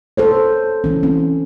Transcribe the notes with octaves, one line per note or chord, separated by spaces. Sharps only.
A4 C5 C#5
E3 C#4
C4 C#4